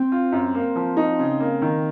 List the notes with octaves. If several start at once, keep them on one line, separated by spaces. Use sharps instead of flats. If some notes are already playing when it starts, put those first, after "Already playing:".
Already playing: C4
F4
F#2
A#3
F3
D#4
C#3
A#3
D#3